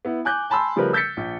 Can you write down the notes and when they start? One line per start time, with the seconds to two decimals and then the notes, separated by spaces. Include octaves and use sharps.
0.05 B3 E4
0.25 G#5 D6 F#6 G6
0.50 G#5 A5 B5 C6 E6
0.76 C#3 F3 G3 A3 A#4 B4
0.93 E6 G6 A6 B6 C#7
1.17 A#1